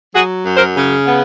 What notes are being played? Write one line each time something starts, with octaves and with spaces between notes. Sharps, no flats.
F#3 F#4 G#4
F#2
A#4 C5
C#3
B3